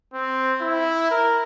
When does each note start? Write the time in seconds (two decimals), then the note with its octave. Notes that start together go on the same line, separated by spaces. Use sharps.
0.14 C4
0.61 E4
1.11 A#4